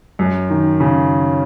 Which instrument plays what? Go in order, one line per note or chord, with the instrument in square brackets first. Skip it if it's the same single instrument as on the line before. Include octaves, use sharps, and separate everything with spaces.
[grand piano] F#2
D#3
C#3